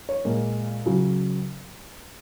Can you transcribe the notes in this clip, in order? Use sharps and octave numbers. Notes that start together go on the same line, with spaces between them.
C#5
A#2 G#3 A#4
C#3 F#3